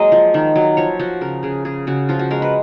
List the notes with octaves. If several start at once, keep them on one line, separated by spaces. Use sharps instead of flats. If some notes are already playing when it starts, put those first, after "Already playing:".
Already playing: F#3 G#3 A#3 D#5
F3
D#3
F#3
F3 C#5
F3 F#4
C#3 A#4
C#3 G#4
C#3 G#4
C#3 F#4
F3 F4
F#4
G#3 A#4
B4